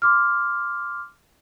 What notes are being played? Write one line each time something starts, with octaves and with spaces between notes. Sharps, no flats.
C6 D6 F6